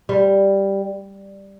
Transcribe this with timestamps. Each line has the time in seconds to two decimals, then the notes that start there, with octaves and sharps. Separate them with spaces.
0.09 G3